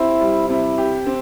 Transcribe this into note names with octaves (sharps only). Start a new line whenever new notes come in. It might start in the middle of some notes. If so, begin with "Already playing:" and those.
Already playing: C4 E4 G4
G3
C3 E4
G4
C4